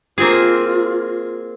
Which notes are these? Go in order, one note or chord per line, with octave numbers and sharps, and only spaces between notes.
A#3 C4 F4 G#4